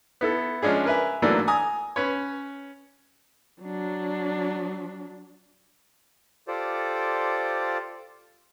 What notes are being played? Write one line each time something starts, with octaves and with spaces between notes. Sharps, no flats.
B3 E4 A4
F3 G#3 C#4 D4 G#4
A#4 B4 E5 G#5
G#2 E3 F#3 A3 A#3 D4
G#5 A#5 D#6
C#4 B4 C#5
F#3 D4
F4 G4 A4 C5 D5